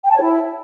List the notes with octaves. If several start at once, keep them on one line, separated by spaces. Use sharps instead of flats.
G5
A5
C#5
E4